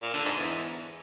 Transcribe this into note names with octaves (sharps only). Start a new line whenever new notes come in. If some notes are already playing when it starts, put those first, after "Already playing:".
A#2
D3
G#2
E2